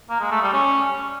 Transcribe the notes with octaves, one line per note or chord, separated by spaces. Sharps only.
A#3
G#3
A3
G3
C#4